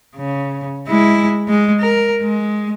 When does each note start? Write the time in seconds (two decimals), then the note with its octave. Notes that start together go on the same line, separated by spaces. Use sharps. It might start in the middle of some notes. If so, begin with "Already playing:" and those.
0.16 C#3
0.88 G#3 E4
1.48 G#3
1.80 A#4
2.22 G#3